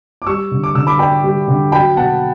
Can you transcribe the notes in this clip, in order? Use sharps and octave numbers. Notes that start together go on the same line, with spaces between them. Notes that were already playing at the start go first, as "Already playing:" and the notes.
D6
G3 C#6 E6
D3
D6
D3 E6
B5 D6
D4 G5 B5
G3
D3
F#3 G5 B5
B2 F#5 A5